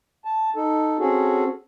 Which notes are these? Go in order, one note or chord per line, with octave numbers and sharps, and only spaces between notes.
A5
D#4 A4
C4 C#4 F#4 G#4 A4